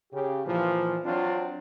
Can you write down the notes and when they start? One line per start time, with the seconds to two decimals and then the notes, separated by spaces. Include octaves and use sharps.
0.13 C#3 G4
0.46 A#2 E3 F3
1.05 F#3 C4 D4 F4